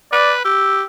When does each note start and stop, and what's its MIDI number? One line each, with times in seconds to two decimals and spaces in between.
0.12 0.45 71
0.12 0.33 74
0.45 0.83 67
0.45 0.84 88